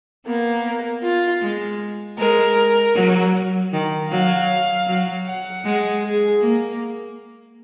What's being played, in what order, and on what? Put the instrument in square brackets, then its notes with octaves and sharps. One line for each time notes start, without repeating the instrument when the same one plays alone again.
[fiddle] A#3 [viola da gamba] B3
[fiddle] F4
[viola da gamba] G#3
[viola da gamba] G#3 [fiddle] A#4
[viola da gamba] F#3
D#3
[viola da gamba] F#3 [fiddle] F5
[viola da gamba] F#3
[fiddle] F#5
[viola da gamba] G#3
[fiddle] G#4
[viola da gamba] A#3